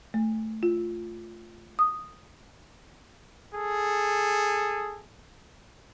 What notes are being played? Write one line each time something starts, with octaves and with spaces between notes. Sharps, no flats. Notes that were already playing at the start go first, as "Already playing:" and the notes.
A3
F4
D#6
G#4 A4